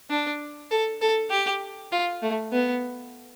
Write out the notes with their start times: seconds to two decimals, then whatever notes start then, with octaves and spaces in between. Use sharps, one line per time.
0.10 D4
0.71 A4
1.01 A4
1.31 G4
1.92 F4
2.22 A3
2.52 B3